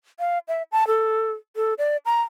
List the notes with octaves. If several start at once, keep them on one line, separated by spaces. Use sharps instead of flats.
F5
E5
A5
A4
A4
D5
A#5